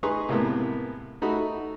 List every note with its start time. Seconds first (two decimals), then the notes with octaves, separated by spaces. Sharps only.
0.03 D#4 G#4 B4 A#5 C6 C#6
0.29 A2 C3 G#3 A#3 B3
1.22 A3 D#4 F#4 B5